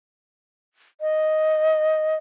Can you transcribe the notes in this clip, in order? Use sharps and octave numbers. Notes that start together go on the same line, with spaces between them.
D#5